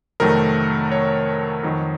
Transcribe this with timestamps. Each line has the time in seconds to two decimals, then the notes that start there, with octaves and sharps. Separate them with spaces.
0.20 F2 C3 D#3 F#3 A3 A#4
0.92 C#5
1.63 F2 D#3 F#3